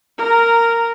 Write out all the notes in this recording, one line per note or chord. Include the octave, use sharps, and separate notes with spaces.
A#4 A#5